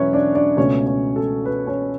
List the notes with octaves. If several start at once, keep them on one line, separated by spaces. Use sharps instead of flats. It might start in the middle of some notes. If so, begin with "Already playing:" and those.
Already playing: E1 F#3 C#4 E4 B4 C#5
D4 D5
D4 D5
C#2 B2 A3 C#4 C#5
C#4 C#5
A4
B4
C#4 C#5